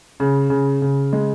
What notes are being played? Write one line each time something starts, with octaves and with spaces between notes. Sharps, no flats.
C#3
C#3
C#3
G#3